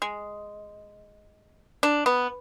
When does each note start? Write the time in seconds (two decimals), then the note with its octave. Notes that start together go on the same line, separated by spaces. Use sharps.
0.02 G#3
1.83 D4
2.06 B3